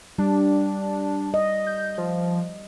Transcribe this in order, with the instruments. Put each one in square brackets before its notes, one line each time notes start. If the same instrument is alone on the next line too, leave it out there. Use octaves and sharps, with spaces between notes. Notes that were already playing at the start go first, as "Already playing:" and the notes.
[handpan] G3 [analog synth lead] D4
[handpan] D#5
[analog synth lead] G6
F3